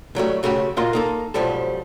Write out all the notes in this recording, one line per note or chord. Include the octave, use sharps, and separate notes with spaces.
A2 F#3 G3 A3
F#2 C#3 A3 F#4 G4
A#2 A#3 F4 F#4 D#5 C6
A#3 D#4 A4
B1 G#2 F3 G3 A4 A5